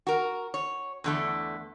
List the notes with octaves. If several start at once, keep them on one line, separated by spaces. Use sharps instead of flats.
F#4 A#4
C#5
E2 D3 A3